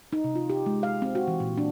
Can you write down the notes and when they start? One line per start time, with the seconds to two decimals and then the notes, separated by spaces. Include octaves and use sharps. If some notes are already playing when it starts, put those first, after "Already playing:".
0.13 D#4
0.24 C3
0.35 F4
0.50 G4
0.66 G#3
0.83 F5
1.02 C4
1.15 F#4
1.27 E3
1.40 A#2
1.58 D4